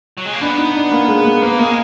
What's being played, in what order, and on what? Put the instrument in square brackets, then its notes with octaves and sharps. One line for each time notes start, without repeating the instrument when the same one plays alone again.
[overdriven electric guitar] F#3
G#3
A#3
[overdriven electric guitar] B3 [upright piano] D4
[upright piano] D#4
D4
A#3
G#3
A#3
[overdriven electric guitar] A#3 [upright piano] B3
[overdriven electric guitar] G#3 [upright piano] A#3